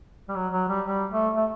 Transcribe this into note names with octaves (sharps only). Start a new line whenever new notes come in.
G3
F#3
F#3
G3
G3
A3
A3